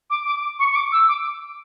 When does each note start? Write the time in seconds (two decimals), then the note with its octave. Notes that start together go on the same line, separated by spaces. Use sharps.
0.10 D6
0.26 D6
0.59 C#6
0.70 C#6
0.76 D6
0.92 E6
1.08 D6